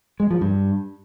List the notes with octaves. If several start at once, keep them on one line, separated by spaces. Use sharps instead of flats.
G#3
F3
G2